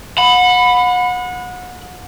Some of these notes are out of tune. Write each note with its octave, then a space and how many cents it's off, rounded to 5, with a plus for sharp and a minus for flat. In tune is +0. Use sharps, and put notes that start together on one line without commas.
F#5 -30 B5 +10